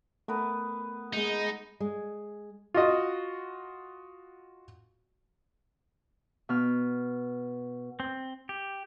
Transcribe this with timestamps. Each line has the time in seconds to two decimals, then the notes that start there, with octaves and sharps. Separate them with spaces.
0.28 A3 B3 A#4 B4
1.13 G#3 D#4
1.80 G#3
2.74 F4 F#4 D#5
6.49 B2 F6
8.00 C4
8.49 G4